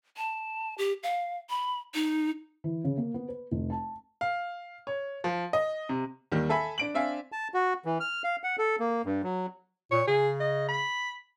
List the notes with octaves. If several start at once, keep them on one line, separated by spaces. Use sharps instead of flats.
A5
G4
F5
B5
D#4
E3
C#3
A#3
B3
B4
F1
A5
F5
C#5
F3
D#5
C3
D#2 D#3 G3
A4 E5 G#5 B5
D4 D7 F#7
C4 D4 E5 F5 G#5
A5
F#4
E3
F6
F5
F#5
A4
A#3
G2
F#3
A#2 C#5
C#3 G#4
D#5
B5